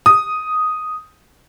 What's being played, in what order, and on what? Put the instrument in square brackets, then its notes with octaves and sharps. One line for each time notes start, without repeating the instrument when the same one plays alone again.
[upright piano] D#6